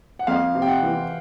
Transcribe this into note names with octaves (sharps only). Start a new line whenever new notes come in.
F#5
F2 F5
C3
G5
F#5
E3